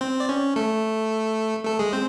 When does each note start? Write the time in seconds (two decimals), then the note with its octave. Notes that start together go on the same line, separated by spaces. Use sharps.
0.01 C4 C5
0.20 D5
0.29 C#4 C#5
0.56 A3 A4
1.65 A3 A4
1.79 G#3 G#4
1.93 C4 C5